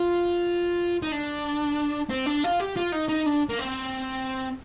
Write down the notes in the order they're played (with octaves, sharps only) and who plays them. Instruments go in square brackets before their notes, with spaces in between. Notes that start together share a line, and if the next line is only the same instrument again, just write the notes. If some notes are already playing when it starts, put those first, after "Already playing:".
Already playing: [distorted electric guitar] F4
D#4
D4
C4
D4
F4
G4
F4
D#4
D#4
D4
A#3
C4